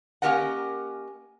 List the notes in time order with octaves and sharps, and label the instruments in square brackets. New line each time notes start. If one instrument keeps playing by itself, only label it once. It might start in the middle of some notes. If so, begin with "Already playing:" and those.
[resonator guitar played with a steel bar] A#3 C#4 G4 A#4 D#5 F#5